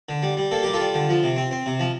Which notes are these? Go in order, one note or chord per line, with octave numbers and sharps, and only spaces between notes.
D3
G3
G3
A#3 A4
G3 G4
F4 A4
G3
D3
F3
C3
C4
C4
C3
F3